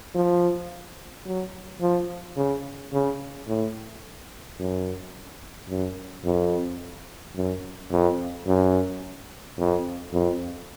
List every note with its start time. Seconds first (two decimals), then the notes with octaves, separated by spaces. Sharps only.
0.15 F3
1.26 F#3
1.81 F3
2.37 C#3
2.93 C#3
3.48 A2
4.59 F#2
5.70 F#2
6.24 F2
7.36 F#2
7.91 F2
8.47 F#2
9.58 F2
10.13 F2